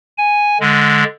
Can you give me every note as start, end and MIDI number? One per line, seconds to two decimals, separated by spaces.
0.18 0.58 80
0.60 1.04 50
0.60 1.04 56